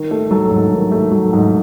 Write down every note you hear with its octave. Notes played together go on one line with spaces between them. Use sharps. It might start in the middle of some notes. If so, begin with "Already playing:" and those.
Already playing: D#3
A3
F#3 A4
G#2
D#3
A3
F#3
G#2